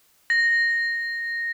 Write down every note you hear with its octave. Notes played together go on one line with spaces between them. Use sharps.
A#6